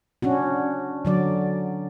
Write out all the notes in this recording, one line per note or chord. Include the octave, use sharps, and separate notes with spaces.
C#4 D4 F#4
D3 F#3 D5